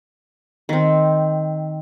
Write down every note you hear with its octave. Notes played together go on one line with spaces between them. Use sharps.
D#3 C4